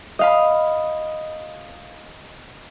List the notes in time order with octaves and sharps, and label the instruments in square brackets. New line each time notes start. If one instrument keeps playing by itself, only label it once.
[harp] D#5 F5 B5